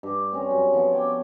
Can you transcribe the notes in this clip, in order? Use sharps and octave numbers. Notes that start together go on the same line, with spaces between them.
G2
C4 C#4 A#4
F#2
F3 B3
C#5 G5 D6